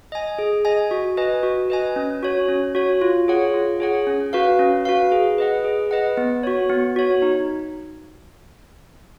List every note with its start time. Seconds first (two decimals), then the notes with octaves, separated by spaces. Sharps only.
0.12 D#5 G#5
0.39 G#4
0.65 D#5 G#5
0.91 F#4
1.17 B4 D#5 G#5
1.43 F#4
1.70 B4 D#5 G#5
1.96 C#4
2.23 F#4 C#5
2.48 C#4
2.75 F#4 C#5
3.01 F4
3.28 G#4 C#5 F#5
3.54 F4
3.80 G#4 C#5 F#5
4.07 C#4
4.33 F#4 B4 F5
4.59 C#4
4.85 F#4 B4 F5
5.12 G#4
5.38 B4 D#5 F#5
5.65 G#4
5.91 B4 D#5 F#5
6.17 B3
6.43 F#4 C#5
6.69 B3
6.96 F#4 C#5
7.22 D#4